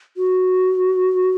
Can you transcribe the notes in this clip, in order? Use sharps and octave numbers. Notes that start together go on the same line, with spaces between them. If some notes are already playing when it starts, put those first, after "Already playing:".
F#4